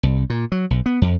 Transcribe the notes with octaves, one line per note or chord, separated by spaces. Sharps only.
C2
A#2
F#3
B1
B3
F2